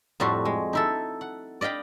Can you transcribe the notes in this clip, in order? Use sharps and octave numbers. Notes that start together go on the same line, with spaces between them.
F2 A2 G3 F#4 C6
G#3
D#4 E4 A4
F#5
D5 D#5 F5 G5 B5